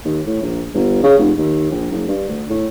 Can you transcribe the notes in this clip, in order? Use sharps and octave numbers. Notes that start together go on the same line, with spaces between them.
D#2
A2
A#1
G1
C#3
F1
D#2
A#1
F#1
G2
D2
A2